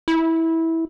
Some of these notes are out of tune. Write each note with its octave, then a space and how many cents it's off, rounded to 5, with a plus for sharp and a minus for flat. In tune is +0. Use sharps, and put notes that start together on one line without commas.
E4 -15